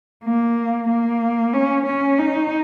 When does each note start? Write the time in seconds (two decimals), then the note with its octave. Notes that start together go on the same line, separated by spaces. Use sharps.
0.24 A#3
0.89 A#3
1.54 C#4
1.86 C#4
2.19 D#4